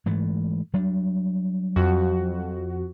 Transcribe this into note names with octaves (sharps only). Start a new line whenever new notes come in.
G#2 E3 A3
F#3 G3 D4
F2 F#4